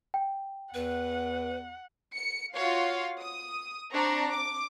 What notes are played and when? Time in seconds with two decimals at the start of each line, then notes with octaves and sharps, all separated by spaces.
0.14 G5
0.74 E2 B4 F#5
2.15 C#7
2.56 F4 F#4 C#5 F5
3.20 D#6
3.93 C4 D4 A#5 C#6
4.33 D6